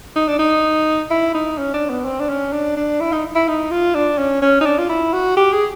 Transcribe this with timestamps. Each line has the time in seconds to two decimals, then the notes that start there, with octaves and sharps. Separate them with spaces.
0.16 D#4
0.28 D4
0.39 D#4
1.10 E4
1.34 D#4
1.58 C#4
1.74 D4
1.90 B3
2.05 C4
2.20 D4
2.29 C#4
2.53 D4
2.76 D4
3.00 E4
3.12 D#4
3.35 E4
3.48 D#4
3.71 F4
3.95 D4
4.18 C#4
4.42 C#4
4.61 D#4
4.65 D4
4.78 F4
4.89 E4
5.13 F#4
5.37 G4
5.53 G#4